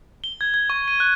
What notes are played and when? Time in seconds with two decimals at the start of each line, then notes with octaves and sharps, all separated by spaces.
0.24 G7
0.41 G#6
0.54 G#6
0.70 C#6
0.88 D#7
1.00 F#6